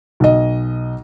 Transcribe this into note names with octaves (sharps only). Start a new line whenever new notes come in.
B1 D#5